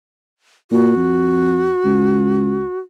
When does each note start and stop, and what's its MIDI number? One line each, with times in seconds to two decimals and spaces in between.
0.71 0.95 46
0.71 2.79 66
0.96 1.71 41
1.85 2.63 37